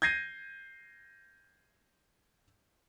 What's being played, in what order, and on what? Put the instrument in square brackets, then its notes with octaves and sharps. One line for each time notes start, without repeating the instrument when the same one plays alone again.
[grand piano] G6 G#6 A#6 C7 D#7